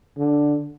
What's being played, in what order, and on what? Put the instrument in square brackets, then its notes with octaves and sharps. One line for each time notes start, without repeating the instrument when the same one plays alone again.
[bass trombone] D3